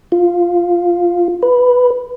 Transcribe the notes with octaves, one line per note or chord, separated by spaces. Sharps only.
F4
B4